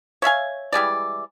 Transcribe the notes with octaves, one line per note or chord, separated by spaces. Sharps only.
C#5 E5 F5 G#5
E3 G3 G#3 D5